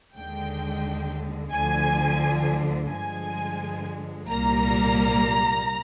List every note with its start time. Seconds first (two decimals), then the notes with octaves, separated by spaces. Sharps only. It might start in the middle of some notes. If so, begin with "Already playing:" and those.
0.14 D#2 D3 G#3 G5
1.52 D2 D3 F3 G#5
2.90 G2 D3 F3 G#3 G#5
4.29 C2 A#2 G3 A#3 A#5